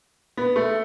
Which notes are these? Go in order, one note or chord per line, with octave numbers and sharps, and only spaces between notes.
B3
A3